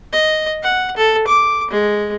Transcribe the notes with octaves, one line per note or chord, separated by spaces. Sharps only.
D#5
F#5
A4
D6
G#3